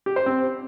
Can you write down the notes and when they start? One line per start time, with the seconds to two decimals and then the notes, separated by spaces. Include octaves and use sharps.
0.06 G4
0.16 C5
0.26 C4